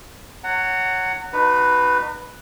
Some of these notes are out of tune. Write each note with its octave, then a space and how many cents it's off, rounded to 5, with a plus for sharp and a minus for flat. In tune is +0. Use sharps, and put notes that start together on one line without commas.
C#5 +0 F#5 +10 A#5 -30
D#4 -30 F#4 +0 B4 +5